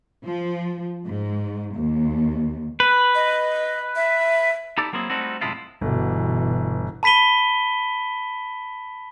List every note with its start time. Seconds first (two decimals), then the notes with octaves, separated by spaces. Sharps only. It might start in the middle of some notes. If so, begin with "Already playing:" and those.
0.25 F3
1.05 G#2
1.75 D#2
2.80 B4
3.15 D#5
3.96 E5
4.78 D#4 E4 G4 A4 D5
4.93 F#3 A#3 C4 E4 G#4
5.10 G3 A3 C4 D#4 E4 F#4
5.41 F#2 A2 C3 G#3 E4 F4
5.81 G1 B2 E3
7.03 A5 B5 B6 D#7 G7